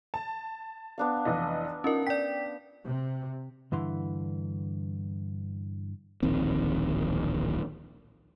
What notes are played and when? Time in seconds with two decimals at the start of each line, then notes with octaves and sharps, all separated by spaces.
0.14 A5
0.98 B3 D4 F5
1.25 F1 E3 D#5
1.84 C#4 D#4 F4 A#4
2.07 D5 G5 B6
2.86 C3
3.72 G2 D3 E3 C6
6.23 D1 A#1 D#3 C4